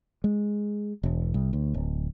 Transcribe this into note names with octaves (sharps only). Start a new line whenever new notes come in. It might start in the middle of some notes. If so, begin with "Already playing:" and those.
G#3
E1
C2
D2
D1